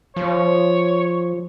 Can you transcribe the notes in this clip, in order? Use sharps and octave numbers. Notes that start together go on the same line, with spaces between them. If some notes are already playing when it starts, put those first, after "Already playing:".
F3 C#5